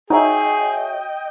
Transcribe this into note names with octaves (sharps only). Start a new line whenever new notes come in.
D#4 F#4 G#4 C#5 D#5 E5 G5